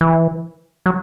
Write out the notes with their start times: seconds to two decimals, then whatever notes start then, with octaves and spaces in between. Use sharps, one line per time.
0.01 E3
0.86 F#3